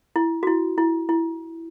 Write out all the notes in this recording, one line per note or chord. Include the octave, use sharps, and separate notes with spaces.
E4
F#4
E4
E4
E4